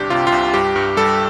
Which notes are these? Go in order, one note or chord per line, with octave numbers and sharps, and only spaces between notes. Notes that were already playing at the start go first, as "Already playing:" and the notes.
Already playing: G1 C2 D4 G4
C3 F4
F4
C2
G2 G4
G2
G3 A4